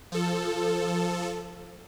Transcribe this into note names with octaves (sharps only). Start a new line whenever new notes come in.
F3 A4